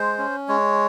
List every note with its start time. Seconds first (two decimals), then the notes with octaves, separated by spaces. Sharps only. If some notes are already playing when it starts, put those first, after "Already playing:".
Already playing: G#3 C5
0.18 C#4
0.48 G#3 C#5